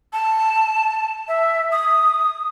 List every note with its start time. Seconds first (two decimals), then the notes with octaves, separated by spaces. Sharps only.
0.13 A5
1.28 E5
1.72 D#6